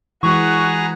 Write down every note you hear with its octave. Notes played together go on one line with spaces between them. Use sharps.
E3 G#3 F#4 G#4 B4 A#5 C#6